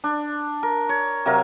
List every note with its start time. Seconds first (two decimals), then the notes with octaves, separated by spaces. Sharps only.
0.04 D4
0.63 A#4
0.89 C#5
1.26 C3 F#3 A#4 F5